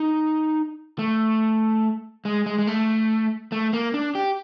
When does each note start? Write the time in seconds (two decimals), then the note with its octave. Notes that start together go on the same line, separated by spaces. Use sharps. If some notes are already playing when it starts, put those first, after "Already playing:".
Already playing: D#4
0.99 A3
2.25 G#3
2.46 G#3
2.59 G#3
2.67 A3
3.52 A3
3.73 A#3
3.94 D4
4.15 G4